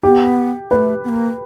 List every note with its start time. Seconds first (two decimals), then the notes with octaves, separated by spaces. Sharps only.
0.03 B3 G4
0.71 A3 A#3 B4
1.04 B3
1.09 A#3